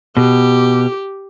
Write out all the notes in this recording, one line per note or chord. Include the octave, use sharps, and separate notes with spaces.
B2 G4